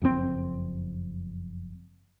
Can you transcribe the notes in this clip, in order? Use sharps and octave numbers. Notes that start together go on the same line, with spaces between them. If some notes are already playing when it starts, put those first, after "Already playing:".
F#1 F2 A2 C4